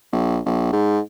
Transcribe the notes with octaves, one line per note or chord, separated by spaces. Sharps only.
A#1
A#1
G#2